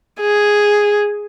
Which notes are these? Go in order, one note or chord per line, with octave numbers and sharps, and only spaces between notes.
G#4